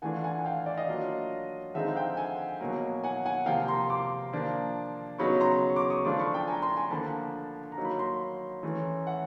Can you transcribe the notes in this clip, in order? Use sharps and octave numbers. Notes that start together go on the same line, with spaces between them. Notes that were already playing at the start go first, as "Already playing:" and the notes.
E3 A3 D4 F4 F#5 G#5
F#5 G#5
G#5
F5 G5
D5 E5
D#5 F5
F#3 A#3 D4 F4
D3 F3 G#3 C4 D#4 E5 F#5
F5 G5
F#5 G#5
B2 F#3 A#3
F#5 G#5
F#5 G#5
C3 F3 A#3 F5 G5
A#5 C6
C6 D6
F3 A#3 D4
C#3 F#3 B3 D#4 B5 C#6
A#5 C6
C#6
C6 D6
C#6 D#6
F3 A3 D4 F4 C6 D6
B5 C#6
G5 A5
G#5 A#5
A#5 C6
G#5 A#5
D3 F3 A#3 A5 B5
A#5
F#3 A#3 D#4
B5
A#5 C6
E3 A3 C#4
E5 F#5